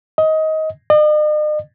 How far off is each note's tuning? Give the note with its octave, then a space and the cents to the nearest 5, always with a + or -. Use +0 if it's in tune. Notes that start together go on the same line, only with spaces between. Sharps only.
D#5 +20
D#5 -45